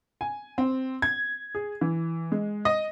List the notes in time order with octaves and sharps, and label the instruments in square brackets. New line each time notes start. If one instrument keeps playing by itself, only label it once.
[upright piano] G#5
C4
G#6
G#4
E3
G#3
D#5